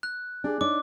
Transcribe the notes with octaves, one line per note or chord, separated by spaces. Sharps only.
F#6
D4 G4 G#4
D4 D#4 C#5 D6